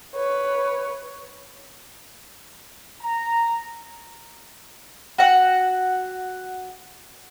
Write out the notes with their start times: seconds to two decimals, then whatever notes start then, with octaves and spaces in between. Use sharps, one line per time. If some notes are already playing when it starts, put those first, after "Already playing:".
0.15 B4 C#5
3.01 A#5
5.18 F#4 F#5